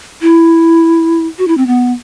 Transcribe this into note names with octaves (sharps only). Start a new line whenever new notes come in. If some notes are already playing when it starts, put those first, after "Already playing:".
E4
F#4
E4
C4
B3